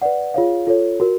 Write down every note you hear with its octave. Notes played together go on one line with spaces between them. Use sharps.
B4 D5 F#5
F4 G#4 C#5 F5
F4 A4 C#5
F#4 A#4